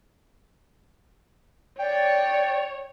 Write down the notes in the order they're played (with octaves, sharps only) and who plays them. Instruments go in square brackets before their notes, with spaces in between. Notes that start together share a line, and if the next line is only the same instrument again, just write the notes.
[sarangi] C#5 [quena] D5 [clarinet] G5